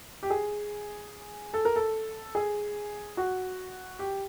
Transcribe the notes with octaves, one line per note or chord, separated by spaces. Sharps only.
G4
G#4
A4
A#4
A4
G#4
F#4
G4